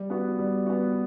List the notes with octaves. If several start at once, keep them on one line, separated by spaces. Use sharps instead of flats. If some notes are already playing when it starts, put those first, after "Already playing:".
Already playing: G3
B3 F#4
G3
B3 F#4